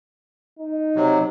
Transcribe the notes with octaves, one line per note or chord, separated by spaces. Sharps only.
D#4
C3 F#3